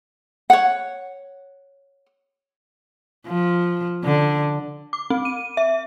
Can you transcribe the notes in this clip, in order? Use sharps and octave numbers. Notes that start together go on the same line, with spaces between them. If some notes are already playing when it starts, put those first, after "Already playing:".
C#5 F#5
F3
D3
D6
C4
D#7
E5